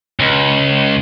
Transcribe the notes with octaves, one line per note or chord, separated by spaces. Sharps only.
C#2